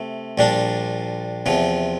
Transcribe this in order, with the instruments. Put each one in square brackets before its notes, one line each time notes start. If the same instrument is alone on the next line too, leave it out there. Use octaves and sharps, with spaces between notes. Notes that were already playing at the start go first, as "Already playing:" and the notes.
Already playing: [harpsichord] C3 A3
A#1 A#2 G3 D4
E2 C3 F3